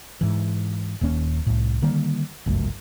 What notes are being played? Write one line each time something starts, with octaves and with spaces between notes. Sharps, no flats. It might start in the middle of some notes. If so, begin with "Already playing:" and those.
G#2 E3
D#1 D#2 A#3 C#4
C2 A2
D3 D#3 G3 A#3
G1 C#2 F#2 A3